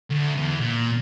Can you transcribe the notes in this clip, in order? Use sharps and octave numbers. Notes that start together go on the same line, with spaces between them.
D2
E2
A#2